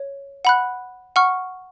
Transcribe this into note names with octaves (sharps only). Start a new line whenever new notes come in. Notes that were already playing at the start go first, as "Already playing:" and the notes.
Already playing: C#5
F#5 B5 F#6
F#5 C#6 F6